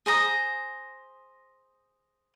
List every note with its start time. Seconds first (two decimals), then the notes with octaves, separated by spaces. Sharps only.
0.06 G#4 C5 A#5 D#6